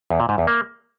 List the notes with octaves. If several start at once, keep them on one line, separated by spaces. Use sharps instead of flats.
E2
A#2
G#2
E2
A#3